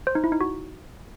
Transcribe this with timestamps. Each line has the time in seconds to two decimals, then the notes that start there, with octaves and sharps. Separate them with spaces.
0.07 C5
0.15 D#4
0.24 E4
0.32 D#4
0.41 F#4